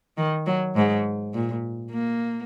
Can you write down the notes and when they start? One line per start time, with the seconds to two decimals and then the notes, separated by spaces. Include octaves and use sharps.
0.17 D#3
0.46 F#3
0.76 G#2
1.34 A#2
1.92 A#3